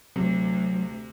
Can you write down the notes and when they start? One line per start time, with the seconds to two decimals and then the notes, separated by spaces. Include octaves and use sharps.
0.16 D2 C3 F#3